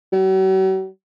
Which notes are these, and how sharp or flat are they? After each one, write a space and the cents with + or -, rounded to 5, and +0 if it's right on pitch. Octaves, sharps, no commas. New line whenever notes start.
F#3 +45